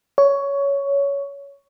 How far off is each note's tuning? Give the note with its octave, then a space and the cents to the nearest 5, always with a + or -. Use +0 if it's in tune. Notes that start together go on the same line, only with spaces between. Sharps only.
C#5 +15